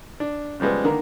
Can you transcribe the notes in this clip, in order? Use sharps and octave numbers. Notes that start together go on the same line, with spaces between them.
D4
C#3 F3 G3 G#3 B3
D3 D#3 A#3